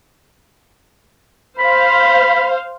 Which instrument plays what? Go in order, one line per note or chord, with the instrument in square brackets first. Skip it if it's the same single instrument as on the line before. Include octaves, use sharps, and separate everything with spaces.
[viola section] C5 F5 [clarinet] B5